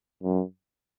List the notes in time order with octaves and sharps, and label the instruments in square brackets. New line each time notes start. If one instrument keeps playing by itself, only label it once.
[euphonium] F#2